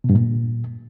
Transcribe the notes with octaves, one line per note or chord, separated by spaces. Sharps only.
B2
G2
A#2